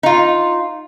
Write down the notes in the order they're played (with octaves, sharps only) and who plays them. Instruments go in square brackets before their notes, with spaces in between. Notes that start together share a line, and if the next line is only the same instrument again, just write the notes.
[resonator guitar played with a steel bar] D#4 F4